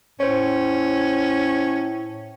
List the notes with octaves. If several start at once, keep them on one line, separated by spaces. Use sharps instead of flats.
A2 C#4 C5 C#5